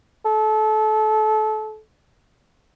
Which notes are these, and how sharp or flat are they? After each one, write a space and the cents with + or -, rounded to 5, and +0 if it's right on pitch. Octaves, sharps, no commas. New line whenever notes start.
A4 -30